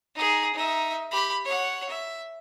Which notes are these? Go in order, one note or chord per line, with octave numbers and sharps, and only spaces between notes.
D#4 G#4
D#4 E5
G4 B5
C#5 F#5
E5